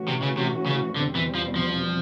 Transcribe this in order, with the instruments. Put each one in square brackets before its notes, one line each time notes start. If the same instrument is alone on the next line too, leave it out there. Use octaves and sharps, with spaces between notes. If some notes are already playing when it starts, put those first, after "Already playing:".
Already playing: [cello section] E3 A3 C#4 F#4
[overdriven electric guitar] C3
C#3
C3
C#3
[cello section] E2 B2 G3 C4 [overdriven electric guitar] D3
[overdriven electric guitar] E3
F3
F3